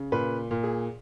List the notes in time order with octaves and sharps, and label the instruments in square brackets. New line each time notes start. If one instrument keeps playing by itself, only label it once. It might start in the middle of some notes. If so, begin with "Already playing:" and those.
Already playing: [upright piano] C#3
A#2 B4
A#2
G#4